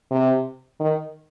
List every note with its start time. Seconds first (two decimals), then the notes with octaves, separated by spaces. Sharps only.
0.11 C3
0.80 D#3